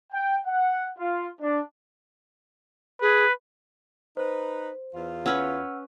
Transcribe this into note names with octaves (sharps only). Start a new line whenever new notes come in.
G5
F#5
F4
D4
G#4 B4
D#4 B4 C5
E2 F4
C#4 B4 C#5 F#5 E6 F6